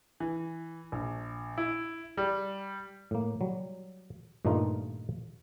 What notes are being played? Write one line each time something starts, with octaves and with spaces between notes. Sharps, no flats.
E3
A#1
E4
G3
A2 A#3
F#3 G3
G2 A#2 D#3 A3 D#4 F4